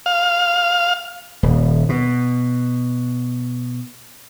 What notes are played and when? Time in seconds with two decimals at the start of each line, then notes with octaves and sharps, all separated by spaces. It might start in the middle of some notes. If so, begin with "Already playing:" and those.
0.06 F5
1.43 D#1
1.89 B2